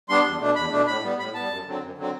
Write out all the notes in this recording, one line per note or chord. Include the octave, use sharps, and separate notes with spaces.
G3 B3 D4 C6
E2
B2 A3 D4
E2 B5
B2 A3 D4
A2 B5
G3 B3
A2 B5
G3 B3 A5
F#2
D3 F#3 C4
F#2
D3 F#3 C4